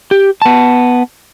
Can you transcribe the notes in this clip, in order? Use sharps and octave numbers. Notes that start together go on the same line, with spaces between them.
G4
B3 A5